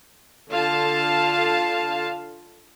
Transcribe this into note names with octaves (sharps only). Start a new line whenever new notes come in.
D3 F4 F5 A5